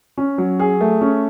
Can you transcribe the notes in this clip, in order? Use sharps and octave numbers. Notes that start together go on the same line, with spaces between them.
C#4
F#3
G#4
A3
C#4